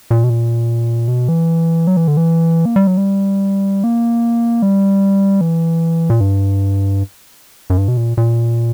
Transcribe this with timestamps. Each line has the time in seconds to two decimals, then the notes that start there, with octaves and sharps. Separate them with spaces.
0.11 A#2
0.24 B2
0.30 A#2
1.08 B2
1.28 E3
1.87 F#3
1.97 E3
2.08 D3
2.17 E3
2.65 A#3
2.76 G3
2.87 F#3
2.97 G3
3.84 A#3
4.62 G3
5.41 E3
6.10 A#2
6.20 G2
7.70 F#2
7.77 G2
7.88 B2
7.97 A#2
8.17 A#2